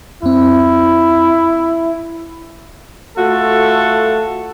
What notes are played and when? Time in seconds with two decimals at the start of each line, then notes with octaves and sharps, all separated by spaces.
0.23 F2 C4 E4
3.18 A3 F4 F#4 A4